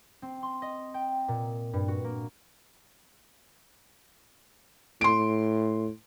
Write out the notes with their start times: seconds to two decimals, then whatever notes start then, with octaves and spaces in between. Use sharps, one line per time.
0.22 C4
0.43 C6
0.62 D#5
0.94 G5
1.28 A#2
1.73 G2
1.88 F#4
2.04 A#3
5.01 A2 C6 D7